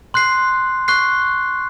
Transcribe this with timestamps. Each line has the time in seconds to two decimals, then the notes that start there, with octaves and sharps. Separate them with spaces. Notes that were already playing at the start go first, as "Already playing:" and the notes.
0.14 C6 F#6 C7
0.88 C#6 F#6 C7